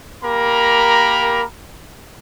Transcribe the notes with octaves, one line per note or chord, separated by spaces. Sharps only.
A#3 G4 A#4 A#5 B5